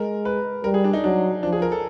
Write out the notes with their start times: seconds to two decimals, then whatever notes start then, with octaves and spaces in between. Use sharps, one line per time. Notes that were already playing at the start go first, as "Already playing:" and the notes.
Already playing: G#3 A#4
0.25 B4
0.64 G3 A#4
0.74 G#4
0.84 D4
0.93 D#4
1.04 F#3 D4
1.43 F3 D4
1.52 G#4
1.62 A#4
1.72 A4